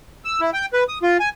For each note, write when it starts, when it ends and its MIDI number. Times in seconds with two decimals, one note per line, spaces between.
0.25 0.40 88
0.41 0.50 64
0.54 0.66 79
0.73 0.84 71
0.88 0.98 87
1.03 1.17 65
1.20 1.29 80